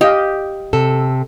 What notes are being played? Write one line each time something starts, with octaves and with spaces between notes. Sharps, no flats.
G4 D#5 F5
C3 A4